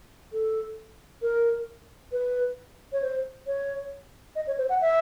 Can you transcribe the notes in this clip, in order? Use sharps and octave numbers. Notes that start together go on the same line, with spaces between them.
A4
A#4
B4
C#5
C5
C#5
D#5
C#5
C5
F#5
E5